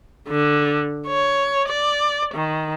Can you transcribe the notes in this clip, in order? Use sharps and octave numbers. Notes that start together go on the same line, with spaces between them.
D3
C#5
D5
D#3